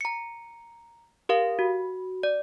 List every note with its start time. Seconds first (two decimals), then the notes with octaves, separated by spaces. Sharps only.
0.01 A#5 C#7
1.29 G4 A#4 F5
1.59 F#4
2.23 D5